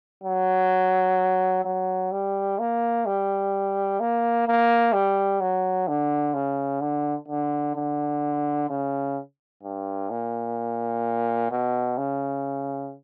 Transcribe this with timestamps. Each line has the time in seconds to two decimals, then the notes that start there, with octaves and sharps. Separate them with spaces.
0.24 F#3
1.65 F#3
2.12 G3
2.59 A#3
3.06 G3
4.00 A#3
4.47 A#3
4.93 G3
5.41 F#3
5.88 D3
6.34 C#3
6.81 D3
7.28 D3
7.76 D3
8.70 C#3
9.63 G2
10.10 A#2
11.51 B2
11.98 C#3